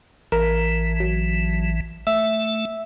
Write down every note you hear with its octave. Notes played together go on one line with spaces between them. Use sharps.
A1 E3 A#4
F#3
A3 E5